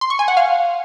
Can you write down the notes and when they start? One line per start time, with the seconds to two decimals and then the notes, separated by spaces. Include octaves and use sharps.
0.01 C6
0.10 C#6
0.19 G#5
0.28 F#5
0.37 F5